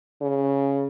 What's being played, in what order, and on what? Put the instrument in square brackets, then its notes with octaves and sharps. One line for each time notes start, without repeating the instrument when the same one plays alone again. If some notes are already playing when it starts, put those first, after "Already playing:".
[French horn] C#3